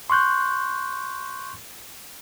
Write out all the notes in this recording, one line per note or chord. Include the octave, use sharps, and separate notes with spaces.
C6 C#6 F#6 G6